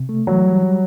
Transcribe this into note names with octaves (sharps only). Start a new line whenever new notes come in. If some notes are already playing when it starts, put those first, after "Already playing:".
Already playing: C3
A3
E3 F#3
G3
G3